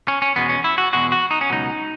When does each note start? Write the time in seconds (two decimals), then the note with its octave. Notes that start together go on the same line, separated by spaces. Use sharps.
0.08 C#4
0.22 C#4
0.36 E2 B2 G#3 B3
0.49 C#4
0.64 E4
0.78 F#4
0.93 E2 B2 G#3 F#4
1.12 F#4
1.31 D#4
1.41 C#4
1.50 C#2 B2 F#3 D#4